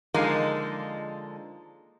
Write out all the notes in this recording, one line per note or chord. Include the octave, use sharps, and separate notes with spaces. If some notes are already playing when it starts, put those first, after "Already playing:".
D3 F3 G#3 A#3 D#4